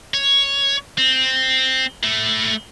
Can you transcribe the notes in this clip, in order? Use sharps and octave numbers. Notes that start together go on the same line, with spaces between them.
C#5
C4
A3 E4